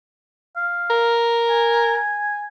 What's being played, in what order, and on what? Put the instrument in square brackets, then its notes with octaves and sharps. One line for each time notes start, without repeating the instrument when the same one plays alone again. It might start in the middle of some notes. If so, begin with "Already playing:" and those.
[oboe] F5
[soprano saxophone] A#4
[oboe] G#5